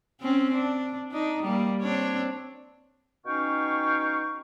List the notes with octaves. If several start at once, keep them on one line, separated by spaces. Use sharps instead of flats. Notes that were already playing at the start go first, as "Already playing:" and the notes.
C4 C#4
D4
D4 D#4
G3 A#3
C4 D4 C#5
B2 C#4 D#4 F5 G5 C#6